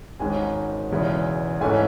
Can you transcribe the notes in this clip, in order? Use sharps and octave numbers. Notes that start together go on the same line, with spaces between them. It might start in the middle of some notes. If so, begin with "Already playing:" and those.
G#1 G#2 D#3 G#3 C#4 G#5
E1 E2 C#3 E3 G#3
G#2 E3 A3 C#4 G#5